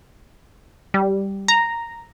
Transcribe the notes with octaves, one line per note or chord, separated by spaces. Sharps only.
G3
A#5